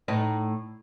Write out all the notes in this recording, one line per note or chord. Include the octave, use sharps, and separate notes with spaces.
A2 D#4